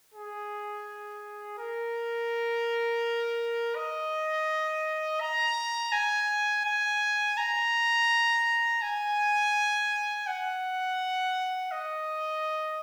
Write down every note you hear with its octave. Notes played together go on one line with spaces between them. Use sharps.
G#4
A#4
D#5
A#5
G#5
G#5
A#5
G#5
F#5
D#5